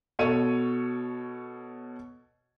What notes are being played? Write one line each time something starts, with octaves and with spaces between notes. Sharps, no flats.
B2 A4 C#5 D#7